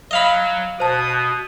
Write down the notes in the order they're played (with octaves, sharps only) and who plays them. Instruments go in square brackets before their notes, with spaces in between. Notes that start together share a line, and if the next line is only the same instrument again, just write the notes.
[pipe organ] F#3 [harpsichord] D#5 F5 B5
[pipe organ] B2 [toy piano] C5 A5 [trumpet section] D#6